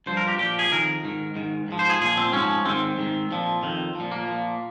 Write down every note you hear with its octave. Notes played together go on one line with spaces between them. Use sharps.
G2 F3 C5
A#4
G4
A#2 F3 G4
G#4
F2 D#3 A#4
G#2 D#3
G#2 D#3
G#2 F3
C5
G#4
A#2 F3 G#4
C4
G#2 F3 C#4
G#2 D#3 C4
G#2 D#3
A#2 F3
F2 D#3
A#2 F3
A#3
A#2 F3